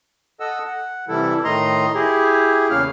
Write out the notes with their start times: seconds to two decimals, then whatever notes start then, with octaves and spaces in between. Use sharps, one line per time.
0.40 A4 D#5 F#5 E6
0.67 F#5
1.08 C3 E3 G3 E4 A4
1.44 A2 D#3 A3 D#5 A#5 C6
1.94 E4 G4 G#4
2.70 E2 C#3 A#3 C#4 F5 F6